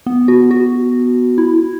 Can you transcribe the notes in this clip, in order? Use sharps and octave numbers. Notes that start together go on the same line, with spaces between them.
B3
F#4
F#4
E4